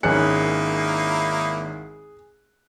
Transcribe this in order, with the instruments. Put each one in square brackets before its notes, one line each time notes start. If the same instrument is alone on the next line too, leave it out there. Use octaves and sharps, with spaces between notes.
[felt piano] G#1 C#4 C#7 [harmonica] A#3 D#4 E4 [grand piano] G#4 F#6